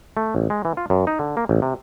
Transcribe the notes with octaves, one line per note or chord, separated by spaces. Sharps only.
A3
A1
G#3
E3
F4
F#2
D#4
D3
A#3
A1
C3